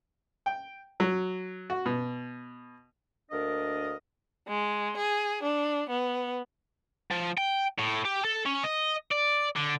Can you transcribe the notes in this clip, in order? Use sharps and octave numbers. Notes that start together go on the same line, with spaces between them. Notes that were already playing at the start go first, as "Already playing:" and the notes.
G5
F#3
F#4
B2
D2 A#3 D4 A#4 D#5
G#3
G#4
D4
B3
F3
G5
A2
G4
A4
C#4
D#5
D5
D3